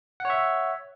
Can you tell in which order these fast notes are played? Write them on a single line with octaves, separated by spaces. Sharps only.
F#5 C#5 E5